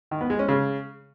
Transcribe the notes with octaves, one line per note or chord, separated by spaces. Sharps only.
D#3
B3
G#3
C#4
C#3